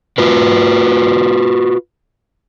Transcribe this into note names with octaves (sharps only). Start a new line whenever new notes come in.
F4 F#4 B4